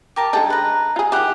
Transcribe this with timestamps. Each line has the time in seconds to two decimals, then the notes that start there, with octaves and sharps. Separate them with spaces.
0.16 G4 A#4 A5
0.33 D3 G#3 D#4 A4 G5
0.50 B4 A#5
0.96 F4 G#4
1.12 D#3 E4 G4 F#5